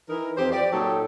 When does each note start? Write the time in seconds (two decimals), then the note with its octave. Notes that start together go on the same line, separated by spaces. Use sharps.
0.09 E3 D#4 A#4
0.37 F2 G4 C5
0.52 G4 D5
0.72 A#2 F#3 D#4 G4 A4